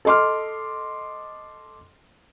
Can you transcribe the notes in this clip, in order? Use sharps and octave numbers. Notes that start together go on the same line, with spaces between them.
A4 D#5 C6 D6 F6